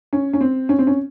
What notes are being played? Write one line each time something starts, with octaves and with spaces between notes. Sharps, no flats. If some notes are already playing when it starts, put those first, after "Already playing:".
C#4
C#4
C4
C#4
C4
C#4